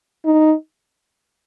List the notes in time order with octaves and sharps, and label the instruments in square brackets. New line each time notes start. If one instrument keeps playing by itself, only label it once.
[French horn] D#4